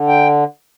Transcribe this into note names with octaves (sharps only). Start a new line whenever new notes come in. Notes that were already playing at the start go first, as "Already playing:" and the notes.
Already playing: D3
G5